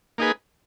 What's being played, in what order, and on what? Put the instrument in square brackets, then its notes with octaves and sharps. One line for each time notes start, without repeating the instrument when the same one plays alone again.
[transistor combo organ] A#3 D#4 G#4 B4